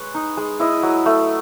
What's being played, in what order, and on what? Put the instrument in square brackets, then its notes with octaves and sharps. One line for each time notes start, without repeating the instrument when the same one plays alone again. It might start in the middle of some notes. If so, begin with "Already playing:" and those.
Already playing: [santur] G#3 B4 C#5
D#4
G#3
E4 D#5
F#3
A3